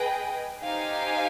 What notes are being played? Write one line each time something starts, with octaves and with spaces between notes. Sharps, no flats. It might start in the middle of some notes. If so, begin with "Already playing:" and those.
Already playing: G#4 B4 D#5 G5
D#4 G4 C5 F5 G#5